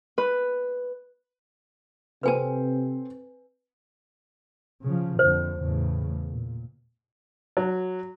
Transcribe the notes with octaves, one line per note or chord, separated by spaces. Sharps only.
B4
C3 C4 A4 B4 C5 G#5 A5
C#3 F3
F2 A#2 D3 C5
E2 A2 C#3
A#2
F#3